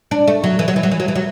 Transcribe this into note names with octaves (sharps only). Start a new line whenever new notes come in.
D4
A3
F#3
E3
F#3
E3
F#3
E3
F#3
E3
F#3